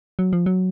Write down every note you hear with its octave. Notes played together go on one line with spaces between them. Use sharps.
F#3
F3
F#3